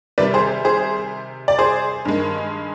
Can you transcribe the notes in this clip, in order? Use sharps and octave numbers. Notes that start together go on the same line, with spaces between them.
C3 D#3 G3 B4 D5
G#4 C5
G#4 C5
D5
G#4 C5
G2 D#3 G#3